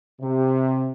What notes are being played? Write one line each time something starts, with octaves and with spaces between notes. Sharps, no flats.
C3